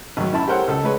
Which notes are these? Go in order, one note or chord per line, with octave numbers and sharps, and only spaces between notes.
G#1 D#3 F#3
F#2 E4 A5 B5
G4 A4 A#4 C5 C#5 F#5
C#2 A4
G#3 B4 C#5